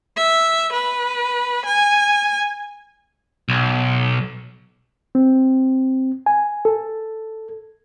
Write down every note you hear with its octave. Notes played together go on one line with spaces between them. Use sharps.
E5
B4
G#5
B1
C4
G#5
A4